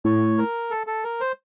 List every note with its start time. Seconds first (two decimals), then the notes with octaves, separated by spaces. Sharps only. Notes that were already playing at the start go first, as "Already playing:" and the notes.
0.05 A2 C#5
0.38 A#4
0.71 A4
0.87 A4
1.04 A#4
1.21 C5